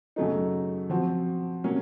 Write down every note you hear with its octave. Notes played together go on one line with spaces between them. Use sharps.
F#2 C#3 F#3 A3 D#4
F3 C4 F#4
C3 F#3 A#3 C#4